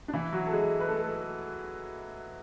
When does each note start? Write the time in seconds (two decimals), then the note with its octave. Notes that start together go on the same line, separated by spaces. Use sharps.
0.08 D4
0.13 E3 E4
0.32 F#3 F#4
0.47 A4
0.53 G#3 G#4
0.80 B4
0.88 A3 A4
1.03 A3 A4